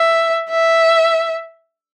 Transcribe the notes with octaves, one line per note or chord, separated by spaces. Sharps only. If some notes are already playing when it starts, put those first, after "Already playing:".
Already playing: E5
E5